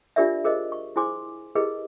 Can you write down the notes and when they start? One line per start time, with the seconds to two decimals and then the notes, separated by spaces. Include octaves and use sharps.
0.16 D4 F4 G4 A#4 D5 E5
0.44 G#4 A#4 C5 D#5
0.72 C#6
0.96 E4 G#4 C5 G#5 C6 D6
1.55 E4 G4 G#4 A#4 B4 D#5